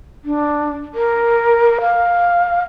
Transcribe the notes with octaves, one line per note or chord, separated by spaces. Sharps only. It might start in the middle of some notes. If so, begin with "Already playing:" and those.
D4
A#4
F5